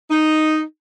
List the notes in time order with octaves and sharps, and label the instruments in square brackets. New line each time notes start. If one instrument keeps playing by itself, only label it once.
[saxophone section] D#4